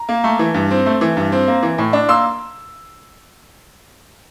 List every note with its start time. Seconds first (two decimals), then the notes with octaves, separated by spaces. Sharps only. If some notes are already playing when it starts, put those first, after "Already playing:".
Already playing: A#5
0.09 A#3
0.24 A3
0.39 E3
0.54 G2
0.71 C4
0.86 A3
1.01 E3
1.17 G2
1.32 C4
1.48 A#3
1.63 E3
1.78 A2
1.93 D4
2.09 A#3 C6 E6